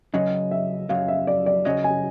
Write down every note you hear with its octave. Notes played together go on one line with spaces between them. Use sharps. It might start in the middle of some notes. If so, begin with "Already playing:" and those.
F#2 C#3 F#3 D#5
E5
F#2 C#3 F#3 F5
E5
D5
D5
F#2 C#3 F#3 D#5
G#5